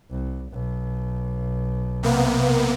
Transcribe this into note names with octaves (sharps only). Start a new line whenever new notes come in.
C2
B1
C3 A#3 B3